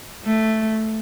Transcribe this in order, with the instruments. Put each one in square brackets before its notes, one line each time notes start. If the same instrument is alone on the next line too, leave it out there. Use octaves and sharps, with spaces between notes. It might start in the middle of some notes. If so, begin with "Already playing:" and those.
[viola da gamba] A3